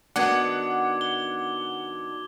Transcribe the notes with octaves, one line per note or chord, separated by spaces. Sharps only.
D#3 B3 D4 F#4 F#5 D6 G#6
G7